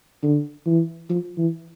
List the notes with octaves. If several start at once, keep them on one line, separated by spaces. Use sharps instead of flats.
D3
E3
F3
E3